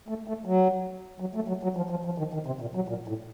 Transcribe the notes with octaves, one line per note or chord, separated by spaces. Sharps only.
A3
A3
F#3
F#3
A3
F#3
F#3
F3
F3
F3
D#3
D#3
C3
A#2
F#3
A#2
A2